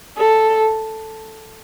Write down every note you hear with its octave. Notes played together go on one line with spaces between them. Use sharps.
A4